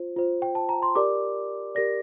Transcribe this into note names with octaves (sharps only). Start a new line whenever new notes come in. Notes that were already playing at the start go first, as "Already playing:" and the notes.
Already playing: F4 C5
F4 C5
G5
A5
A#5
C6
G4 A#4 D5 D6
G4 A#4 D5 A#6